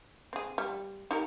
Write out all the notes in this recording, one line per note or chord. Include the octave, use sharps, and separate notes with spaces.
C4 G#4
G3
D#4 G4 A#4